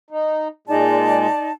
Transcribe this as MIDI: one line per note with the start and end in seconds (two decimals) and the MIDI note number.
0.11 0.48 63
0.67 1.27 46
0.67 1.27 56
0.67 1.50 63
0.67 1.50 74
0.67 1.50 81